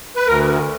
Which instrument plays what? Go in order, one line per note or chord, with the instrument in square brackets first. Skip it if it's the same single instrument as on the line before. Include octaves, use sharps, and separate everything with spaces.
[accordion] B4
D2 A#4